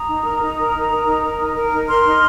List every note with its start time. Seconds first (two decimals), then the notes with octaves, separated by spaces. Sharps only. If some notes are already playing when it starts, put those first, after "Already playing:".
Already playing: A#5 D#6
0.08 D#4
0.25 A#4
0.41 D#4
0.57 A#4
0.74 D#4
0.90 A#4
1.06 D#4
1.22 A#4
1.38 D#4
1.55 A#4
1.72 D#4
1.88 A#4 C6 F6
2.04 D#4